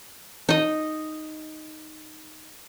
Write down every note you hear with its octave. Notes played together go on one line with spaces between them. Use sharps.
D#4 D#5